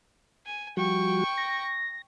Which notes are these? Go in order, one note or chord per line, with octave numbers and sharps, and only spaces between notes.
G#5
F3 G3 F#4 G5 C#6
A#6